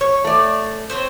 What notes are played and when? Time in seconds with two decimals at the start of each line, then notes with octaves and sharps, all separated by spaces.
0.01 C#5
0.24 A3 D5
0.90 C4 C5 C#5